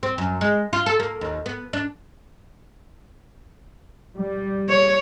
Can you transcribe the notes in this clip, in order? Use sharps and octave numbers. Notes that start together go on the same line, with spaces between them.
C4
F#2
G#3
F4
A4
A#3
D#2
B3
D4
G3
C#5